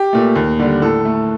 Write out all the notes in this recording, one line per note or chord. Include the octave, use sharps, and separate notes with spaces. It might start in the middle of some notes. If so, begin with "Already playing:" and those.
Already playing: G4
A#2 A3
D#2
D3 G3
A2 A4
A3